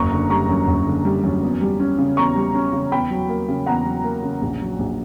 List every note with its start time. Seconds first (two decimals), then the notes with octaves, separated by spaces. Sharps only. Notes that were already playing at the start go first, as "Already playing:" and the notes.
Already playing: F#1 A#5 C#6
0.12 D3
0.30 G3 A#5 C#6
0.49 F#2
0.68 F#1
0.87 D3
1.05 G3
1.23 F#2
1.42 E2
1.61 G3
1.80 C#4
1.98 C#3
2.17 E2 A#5 C#6
2.36 G3
2.54 C#4
2.73 C#3
2.92 E2 G5 B5
3.11 F#3
3.29 A#3
3.48 C#3
3.66 E2 F#5 A#5
3.86 F#3
4.04 A#3
4.23 C#3
4.41 A#1
4.61 F#3
4.79 A#1